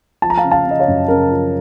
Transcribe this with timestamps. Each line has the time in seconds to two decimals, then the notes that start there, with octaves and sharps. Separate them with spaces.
0.22 F3 A5
0.30 A#5
0.38 F5 A5
0.44 C#3
0.51 F5 A5
0.66 C#3
0.71 D#5
0.79 C#5 F5
0.88 F#2
1.08 C#3 A#4
1.31 F3